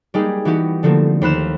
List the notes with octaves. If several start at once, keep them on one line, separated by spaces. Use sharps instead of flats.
G3 G#3 A#3 D#4 G4 G#4
E3 B3 D#4 F#4 G4
D3 F3 A3 A#3 C4
D#2 C5 B5 F6 F#6 E7